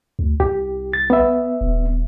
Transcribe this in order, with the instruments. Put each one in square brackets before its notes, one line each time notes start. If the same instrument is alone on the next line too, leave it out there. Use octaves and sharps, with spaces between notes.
[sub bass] D2
[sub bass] C2 [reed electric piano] G4
[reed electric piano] A6
B3 E5
[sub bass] D#1